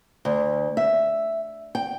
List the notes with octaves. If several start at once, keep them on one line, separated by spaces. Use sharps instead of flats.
D2
E5
G5